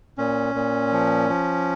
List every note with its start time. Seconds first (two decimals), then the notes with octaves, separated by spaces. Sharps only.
0.18 A#2 C#4
0.55 A#2
0.92 F3
1.29 F3